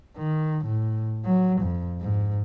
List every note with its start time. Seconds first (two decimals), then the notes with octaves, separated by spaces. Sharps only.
0.17 D#3
0.66 A2
1.25 F#3
1.61 F2
2.01 G#2